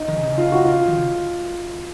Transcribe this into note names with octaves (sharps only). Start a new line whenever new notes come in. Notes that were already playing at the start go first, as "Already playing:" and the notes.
Already playing: D#4
D#3
C#3
C3
C#3
F4
F#4
F4
D#3
C#3